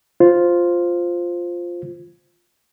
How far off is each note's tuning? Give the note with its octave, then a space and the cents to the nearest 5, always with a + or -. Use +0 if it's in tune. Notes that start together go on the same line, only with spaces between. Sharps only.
F4 +0 C5 +0